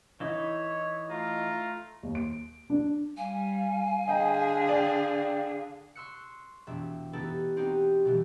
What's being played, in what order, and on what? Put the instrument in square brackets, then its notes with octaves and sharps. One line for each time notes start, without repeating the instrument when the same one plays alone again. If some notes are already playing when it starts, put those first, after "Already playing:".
[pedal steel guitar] E3 D#4 E4 [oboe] C#5
[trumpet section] A3 F4 [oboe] A#5
[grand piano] D#2
D7
D4
[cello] G3 [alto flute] F5 [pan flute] G#5
[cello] D3 G#4 [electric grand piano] D#5 G5 A#5
[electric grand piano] D5 G5
[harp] C6 C#6 E6 F#6 C#7
E1 E5
E3 B3 D#4 G4 A4 B4
C4 D#4 F#4 G4
B2 E3 G3